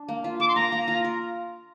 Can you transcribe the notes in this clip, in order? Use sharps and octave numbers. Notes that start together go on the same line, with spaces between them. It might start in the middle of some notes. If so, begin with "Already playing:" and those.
Already playing: D4
A#3
F4
A4 D6
C6
A#3 A#5
A#3
F4
A#4